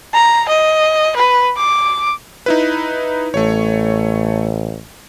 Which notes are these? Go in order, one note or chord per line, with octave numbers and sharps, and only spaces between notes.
A#5
D#5
B4
D6
D#4 E4 B4
A1 A3 C#5